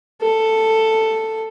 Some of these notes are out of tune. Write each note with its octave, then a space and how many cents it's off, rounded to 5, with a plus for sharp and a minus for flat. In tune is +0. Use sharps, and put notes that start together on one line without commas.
A4 +10